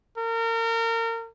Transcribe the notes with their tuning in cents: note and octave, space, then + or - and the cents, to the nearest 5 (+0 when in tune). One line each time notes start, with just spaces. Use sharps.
A#4 -30